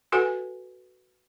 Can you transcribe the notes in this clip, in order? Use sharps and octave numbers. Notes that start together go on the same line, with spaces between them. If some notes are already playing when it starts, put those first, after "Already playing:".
F#4 A4 B4 F#5 G#5